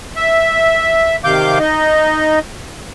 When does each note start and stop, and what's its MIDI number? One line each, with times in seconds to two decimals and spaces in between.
0.16 1.16 76
1.24 1.58 48
1.24 1.58 51
1.24 1.58 77
1.24 1.58 86
1.24 1.58 91
1.59 2.39 63
1.59 2.39 75